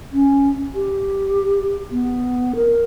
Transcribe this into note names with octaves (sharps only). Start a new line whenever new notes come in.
C#4
G4
B3
A#4